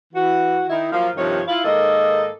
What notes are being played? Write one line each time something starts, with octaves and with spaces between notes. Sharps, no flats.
E3 F#4
D#3 D#4 E4
F3 F#3 A#3 F4 C5 F5
G2 C3 D#3 F3 C#5
E4 F4
G#2 D#3 A#3 A4 D#5